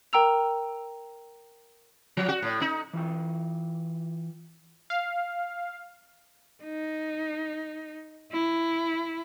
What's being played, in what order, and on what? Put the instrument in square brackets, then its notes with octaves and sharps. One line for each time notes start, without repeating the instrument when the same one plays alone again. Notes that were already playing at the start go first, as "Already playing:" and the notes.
[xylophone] A#4 G5 A#5 E6 F7
[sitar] F3
F#4
A2
D#4
[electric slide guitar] E3 F4 G5
[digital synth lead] F5
[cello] D#4
E4